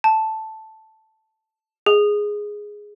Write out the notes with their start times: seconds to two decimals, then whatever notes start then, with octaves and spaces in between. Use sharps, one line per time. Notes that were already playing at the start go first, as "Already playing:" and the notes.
0.04 A5
1.86 G#4